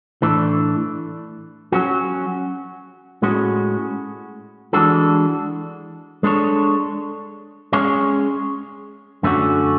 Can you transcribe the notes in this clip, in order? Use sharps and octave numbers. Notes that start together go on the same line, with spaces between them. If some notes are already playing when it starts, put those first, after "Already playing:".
A2 E3 A3 D4
F#3 C#4 F#4
A2 G#3 C#4 F#4
E3 G#3 D4 F#4 A4
G#3 D4 A4 C#5
G#3 C#4 G#4 C#5
F#2 D3 A3 C#4 F#4